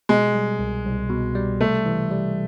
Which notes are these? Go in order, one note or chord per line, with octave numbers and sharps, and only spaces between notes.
B2 G#3
G3
C2
C2
B2
G3
C3 A3
E3
G3